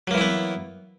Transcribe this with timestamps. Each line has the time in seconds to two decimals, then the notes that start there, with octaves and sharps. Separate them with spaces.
0.07 F#3
0.11 A#3
0.14 E3
0.18 E4
0.21 B3